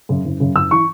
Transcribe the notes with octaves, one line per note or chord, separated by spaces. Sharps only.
F#2 C#3
F#1
F#2 C#3
F#1 E6
E3 C#6